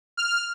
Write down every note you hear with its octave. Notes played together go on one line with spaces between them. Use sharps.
F6